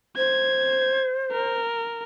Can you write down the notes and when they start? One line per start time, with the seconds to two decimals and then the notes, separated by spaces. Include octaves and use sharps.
0.17 C5 G#6
1.32 A#4